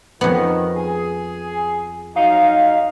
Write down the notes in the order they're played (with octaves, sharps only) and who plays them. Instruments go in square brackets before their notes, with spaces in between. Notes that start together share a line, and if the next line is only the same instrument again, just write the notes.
[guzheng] F2 B3 [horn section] D#3
[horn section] G#4
[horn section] F#3 D#4 [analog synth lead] F5